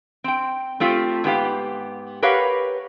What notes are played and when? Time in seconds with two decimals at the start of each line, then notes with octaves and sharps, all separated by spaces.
0.24 C4 G5
0.80 A3 C4 F4 G4
1.24 G#2 B3 G4 F5
2.22 G4 A#4 B4 C#5 F5 F#5